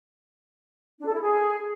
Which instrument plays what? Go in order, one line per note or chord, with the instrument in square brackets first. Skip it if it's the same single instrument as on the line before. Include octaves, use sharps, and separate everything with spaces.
[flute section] D4
A4
E4
G#4